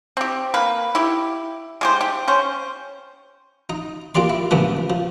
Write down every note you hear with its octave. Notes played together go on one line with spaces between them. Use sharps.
C4 G4
A#3 B4
E4 G4
G#3 G4 C5
G4
C#4 C5
D#4
A#3 F4 G4 D5 C6
E4
C#2 G2 A#2 E3 F3 B3
F3